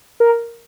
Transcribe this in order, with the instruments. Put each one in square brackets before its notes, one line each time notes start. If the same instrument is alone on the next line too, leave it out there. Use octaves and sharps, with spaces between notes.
[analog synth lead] A#4